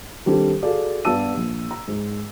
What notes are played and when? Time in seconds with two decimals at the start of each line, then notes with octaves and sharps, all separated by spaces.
0.26 D#3 G3 C4 D4 G4 A4
0.62 F#4 G#4 A4 D5 F5
1.05 G2 B3 D5 A5 E6 D#7
1.37 A#1
1.71 A#5
1.88 G#2